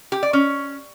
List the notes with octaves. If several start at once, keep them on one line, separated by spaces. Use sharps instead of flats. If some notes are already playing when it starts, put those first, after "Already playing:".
G4
D5
C#4